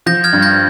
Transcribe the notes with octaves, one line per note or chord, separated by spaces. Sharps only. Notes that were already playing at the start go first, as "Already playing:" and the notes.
F3 G6 A#6
F6 G#6
G2
G6 A#6